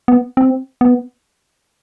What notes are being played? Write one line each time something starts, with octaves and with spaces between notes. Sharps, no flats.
B3
C4
B3